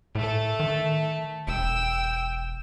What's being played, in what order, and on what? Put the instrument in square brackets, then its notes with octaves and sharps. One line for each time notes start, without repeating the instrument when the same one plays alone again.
[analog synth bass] A2 [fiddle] A3 A4
[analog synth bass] D#3
[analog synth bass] E1 [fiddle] G5 E6